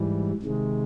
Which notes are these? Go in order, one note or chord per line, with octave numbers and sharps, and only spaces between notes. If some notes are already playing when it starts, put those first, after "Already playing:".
Already playing: G#2 E3 G3
C3 D#3 G#3